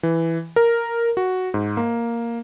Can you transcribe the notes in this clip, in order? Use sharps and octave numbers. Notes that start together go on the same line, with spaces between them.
E3
A#4
F#4
G#2
A#3